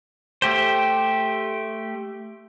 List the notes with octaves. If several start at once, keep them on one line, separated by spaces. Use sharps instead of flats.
A3 G4 C5